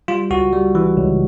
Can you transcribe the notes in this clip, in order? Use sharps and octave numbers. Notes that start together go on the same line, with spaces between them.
G3 F4
C#2 F#4
G3
E3
C#2